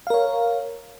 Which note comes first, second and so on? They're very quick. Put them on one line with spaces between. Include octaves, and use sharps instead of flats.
F5 A#4 C#5